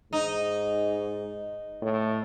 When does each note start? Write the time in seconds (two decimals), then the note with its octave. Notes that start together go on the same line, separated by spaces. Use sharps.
0.13 G#2 D#4
1.82 A2